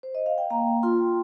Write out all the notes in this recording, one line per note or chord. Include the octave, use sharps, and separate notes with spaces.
C5
D#5
F5
G5
A#3 F5 A#5
F4 G5 C6